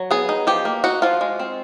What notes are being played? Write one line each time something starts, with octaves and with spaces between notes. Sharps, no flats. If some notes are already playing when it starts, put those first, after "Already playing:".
Already playing: F#3
B3 G#4
D#4
F3 G4
A#3
D#4 F#4
F3 F4
G#3
C4